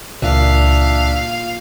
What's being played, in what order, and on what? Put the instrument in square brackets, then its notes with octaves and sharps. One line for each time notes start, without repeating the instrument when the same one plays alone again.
[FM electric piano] C#2 [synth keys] A#2 [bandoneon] D4 E5 F#6 [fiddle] F5